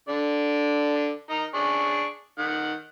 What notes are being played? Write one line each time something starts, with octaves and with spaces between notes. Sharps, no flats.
D3 D5
D#4 A#4 A#5
D4 G#4 C#6
D#3 F#5